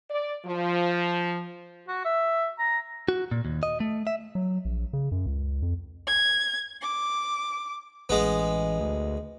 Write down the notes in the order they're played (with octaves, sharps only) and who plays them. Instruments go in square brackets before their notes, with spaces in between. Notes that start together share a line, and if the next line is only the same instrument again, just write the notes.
[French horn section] D5
F3
[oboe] F#4
E5
A#5
[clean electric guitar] F#4
A#2
D#2
D#5
A3
E5
[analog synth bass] F#3
A#1
C#3
F#2
C#2
F2
[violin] G#6
D6
[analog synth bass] A1 [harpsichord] G#3 B3
[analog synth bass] D2